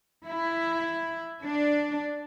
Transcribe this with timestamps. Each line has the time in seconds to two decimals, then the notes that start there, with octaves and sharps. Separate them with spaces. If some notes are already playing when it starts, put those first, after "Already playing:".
0.26 E4
1.41 D4